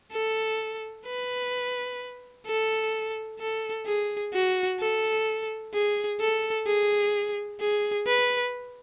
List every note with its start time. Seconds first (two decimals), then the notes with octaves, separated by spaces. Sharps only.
0.11 A4
1.06 B4
2.46 A4
3.40 A4
3.86 G#4
4.33 F#4
4.80 A4
5.74 G#4
6.20 A4
6.67 G#4
7.61 G#4
8.07 B4